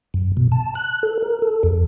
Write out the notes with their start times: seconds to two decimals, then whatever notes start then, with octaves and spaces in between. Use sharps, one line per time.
0.14 F#2
0.37 B2
0.52 A5
0.75 F#6
1.03 A4
1.22 A#4
1.42 A4
1.63 F2